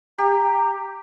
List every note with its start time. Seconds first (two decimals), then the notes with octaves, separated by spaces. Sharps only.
0.18 G4 A#5